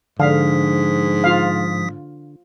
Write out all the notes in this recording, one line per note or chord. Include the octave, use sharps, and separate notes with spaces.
G#2 D3 F3 F5 D#6 B6
F4 F5